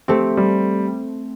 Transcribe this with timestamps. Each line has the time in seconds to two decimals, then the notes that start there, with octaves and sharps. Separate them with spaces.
0.08 A3 C4 G4
0.37 G3